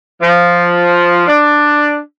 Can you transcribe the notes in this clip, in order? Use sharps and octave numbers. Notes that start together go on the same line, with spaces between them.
F3
D4